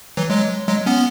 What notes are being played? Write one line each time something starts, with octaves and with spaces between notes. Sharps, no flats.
E3 F#3
F#3 G#3
F#3 G#3
B3 C#4